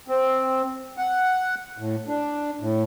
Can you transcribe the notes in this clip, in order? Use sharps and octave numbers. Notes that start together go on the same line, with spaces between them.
C4
F#5
A2
D4
A2